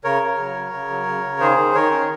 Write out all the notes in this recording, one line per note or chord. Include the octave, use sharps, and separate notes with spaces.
C#3 A#4 C#5
C#3
F#3
C#3
C#3
F#3
C#3
C#3
D#3 G#4 C5
D#3
D#3 A#4 C#5
C#4